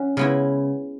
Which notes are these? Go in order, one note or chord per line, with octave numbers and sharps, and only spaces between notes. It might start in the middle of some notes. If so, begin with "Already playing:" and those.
Already playing: C#4 F#4
C#3 G#3 B3 E4